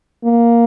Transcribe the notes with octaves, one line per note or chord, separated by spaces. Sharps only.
A#3